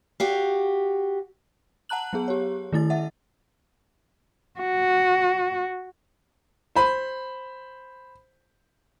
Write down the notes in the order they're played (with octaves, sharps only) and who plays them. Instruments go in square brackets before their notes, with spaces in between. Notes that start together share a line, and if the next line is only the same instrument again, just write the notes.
[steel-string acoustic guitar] F#4 G4 F5
[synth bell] F#5 A5 A#5 F#6 F#7
F#3 B3 G#4
G4 C#5
D#3 A3 E4 A6
E5 F#5
[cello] F#4
[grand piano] C5 B5